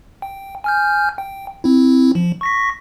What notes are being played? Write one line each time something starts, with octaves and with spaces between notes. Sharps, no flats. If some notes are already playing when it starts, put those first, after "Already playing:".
G5
G#5 F6 G6
G5
C4 E4
F3
C#6 A#6 B6